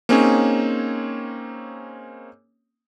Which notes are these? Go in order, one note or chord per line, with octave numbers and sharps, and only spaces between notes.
A#3 C4 C#4 D#4 G#4 C#5